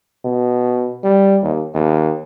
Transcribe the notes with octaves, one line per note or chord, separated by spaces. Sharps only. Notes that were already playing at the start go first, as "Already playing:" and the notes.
B2
G3
D#2
D#2